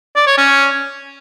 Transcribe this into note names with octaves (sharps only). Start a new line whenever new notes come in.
D5
C#5
C#4